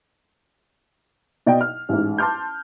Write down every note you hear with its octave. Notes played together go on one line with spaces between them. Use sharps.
B2 D5 D#5 G5
F6
A1 G#2
A5 C6 D6 F6 G6